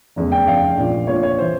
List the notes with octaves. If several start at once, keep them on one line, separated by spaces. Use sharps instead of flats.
F1 E2 C#3
G5
F1 E2 C#3 F5
A#1 A#2 F3
A#1 A#2 F3 C#5
C#5
E3 C5